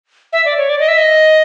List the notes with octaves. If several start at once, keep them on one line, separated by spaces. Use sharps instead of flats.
E5
D5
C#5
D5
D#5
E5
D#5